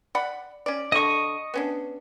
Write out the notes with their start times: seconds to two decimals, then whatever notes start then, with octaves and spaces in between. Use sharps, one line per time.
0.15 D5 F#5 B5
0.66 C#4 D5
0.92 D3 A4 D#5 C#6
1.54 B3 C#4 D4